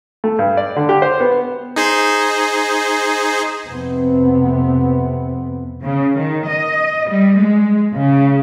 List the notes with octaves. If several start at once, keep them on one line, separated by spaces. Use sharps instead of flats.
A3
G2
D5
D3
G4
C5
B3
D#4 G#4 C5
F2 C3 B3 C4
C#3
D#3
D#5
G3
G#3
C#3